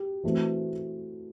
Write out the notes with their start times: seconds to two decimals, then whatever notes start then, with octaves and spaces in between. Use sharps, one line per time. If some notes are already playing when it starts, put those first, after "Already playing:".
Already playing: G4
0.23 E3 A3 C4 F#4